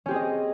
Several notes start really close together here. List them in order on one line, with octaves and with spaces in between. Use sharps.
C#4 G4 C4 G#4 D#5